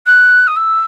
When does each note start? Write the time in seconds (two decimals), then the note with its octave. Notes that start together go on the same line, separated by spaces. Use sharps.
0.06 F#6
0.47 D#6
0.56 E6